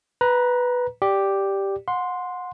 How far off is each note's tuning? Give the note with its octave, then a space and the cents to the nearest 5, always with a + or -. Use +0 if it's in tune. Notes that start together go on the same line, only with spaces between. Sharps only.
B4 +0 A#5 +25
G4 +0 D5 +0
F#5 -30 C6 +0